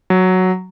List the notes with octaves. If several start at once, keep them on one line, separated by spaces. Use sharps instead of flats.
F#3